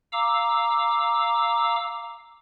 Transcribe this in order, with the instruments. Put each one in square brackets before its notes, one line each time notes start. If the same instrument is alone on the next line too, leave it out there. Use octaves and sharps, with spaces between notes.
[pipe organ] F5 A#5 D6 E6